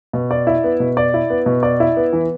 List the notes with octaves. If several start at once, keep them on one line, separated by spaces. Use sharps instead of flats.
B2
D5
E4
B3
B2
D5
E4
B3
B2
D5
E4
B3
E3